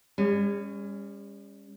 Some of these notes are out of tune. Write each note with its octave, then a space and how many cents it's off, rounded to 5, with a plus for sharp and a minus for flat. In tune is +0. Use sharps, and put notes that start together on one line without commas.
G3 +45 C#4 +5